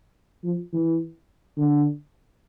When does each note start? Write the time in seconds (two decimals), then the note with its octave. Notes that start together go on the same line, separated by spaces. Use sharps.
0.44 F3
0.73 E3
1.57 D3